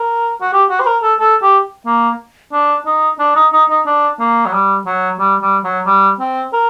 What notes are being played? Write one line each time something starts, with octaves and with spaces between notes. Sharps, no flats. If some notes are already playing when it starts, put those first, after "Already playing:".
Already playing: A#4
F#4
G4
F#4
C5
A#4
A4
A4
G4
A#3
D4
D#4
D4
D#4
D#4
D#4
D4
A#3
F#3
G3
F#3
G3
G3
F#3
G3
C4
A#4